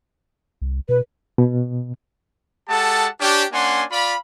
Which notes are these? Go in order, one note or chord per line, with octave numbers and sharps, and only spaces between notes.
C2
B2 B4
B2
G#3 G4 A4 F#5 A5
C#4 D4 G4
A#3 C#4 D4 F#5 G#5 C6
F4 D5 F5 B5